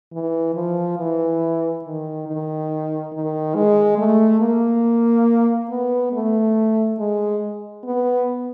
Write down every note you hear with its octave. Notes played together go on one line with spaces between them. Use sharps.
E3
F3
E3
D#3
D#3
D#3
G#3
A3
A#3
B3
A3
G#3
B3